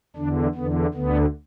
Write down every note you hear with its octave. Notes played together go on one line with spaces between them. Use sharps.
E2 D3 D4
E2 D3 B3
D2 D3 B3